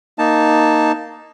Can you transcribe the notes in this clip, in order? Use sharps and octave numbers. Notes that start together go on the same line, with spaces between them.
A#3 D#4 A5